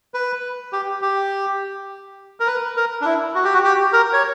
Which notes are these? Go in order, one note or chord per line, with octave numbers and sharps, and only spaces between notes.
B4
G4
G4
A#4
B4
A#4
D4
E4
F#4
G4
F#4
G4
A#4
C#5